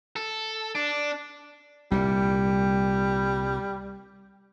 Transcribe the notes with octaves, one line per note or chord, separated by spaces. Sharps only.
A4
D4
C2 A#2 G3